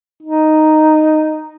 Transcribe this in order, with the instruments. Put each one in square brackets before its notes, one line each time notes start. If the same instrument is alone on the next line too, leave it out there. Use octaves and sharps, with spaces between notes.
[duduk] D#4